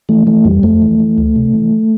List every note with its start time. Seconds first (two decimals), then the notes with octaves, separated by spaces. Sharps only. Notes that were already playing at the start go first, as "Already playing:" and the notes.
0.09 E3 A3
0.27 E3 A3
0.45 F2 G3
0.63 F2 A3
0.82 E3
1.00 E3
1.18 D2
1.36 C3
1.54 E3